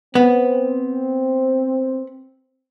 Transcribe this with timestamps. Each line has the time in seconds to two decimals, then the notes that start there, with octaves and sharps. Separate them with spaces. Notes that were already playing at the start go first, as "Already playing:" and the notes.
0.15 B3 C4